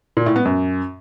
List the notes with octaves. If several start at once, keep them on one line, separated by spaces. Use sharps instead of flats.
A#2
A2
B3
F#2